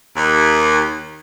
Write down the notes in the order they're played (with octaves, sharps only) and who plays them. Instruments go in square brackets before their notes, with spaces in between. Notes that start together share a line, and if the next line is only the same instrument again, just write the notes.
[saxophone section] D#2